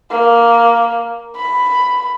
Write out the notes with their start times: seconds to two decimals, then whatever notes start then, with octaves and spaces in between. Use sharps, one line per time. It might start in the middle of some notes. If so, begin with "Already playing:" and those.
0.11 A#3
1.36 B5